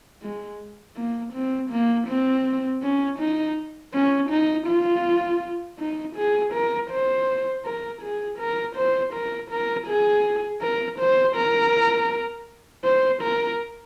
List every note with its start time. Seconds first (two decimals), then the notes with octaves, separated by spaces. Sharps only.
0.22 G#3
0.96 A#3
1.34 C4
1.71 A#3
2.08 C4
2.82 C#4
3.19 D#4
3.94 C#4
4.30 D#4
4.68 F4
5.79 D#4
6.16 G#4
6.54 A#4
6.91 C5
7.65 A#4
8.02 G#4
8.39 A#4
8.76 C5
9.14 A#4
9.51 A#4
9.88 G#4
10.62 A#4
10.99 C5
11.36 A#4
12.85 C5
13.23 A#4